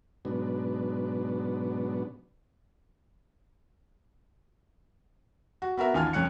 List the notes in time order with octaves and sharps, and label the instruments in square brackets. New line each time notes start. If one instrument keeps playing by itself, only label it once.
[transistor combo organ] G#2 B2 F#3 B3 D4
[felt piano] F#4
B3 F#4 A#4 E5
A1 D#2 F4 G#5 A5 F6
F#1 F2 C#4 F#6 C#7